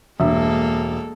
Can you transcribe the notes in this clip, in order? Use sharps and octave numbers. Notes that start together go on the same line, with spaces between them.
E1 G2 G#3 A#3 A4 E5